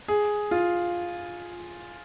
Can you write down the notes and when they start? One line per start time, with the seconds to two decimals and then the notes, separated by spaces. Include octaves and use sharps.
0.08 G#4
0.51 F4